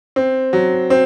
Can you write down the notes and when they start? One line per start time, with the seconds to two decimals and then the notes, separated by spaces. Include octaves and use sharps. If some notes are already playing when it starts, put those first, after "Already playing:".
0.16 C4
0.53 F#3
0.90 C4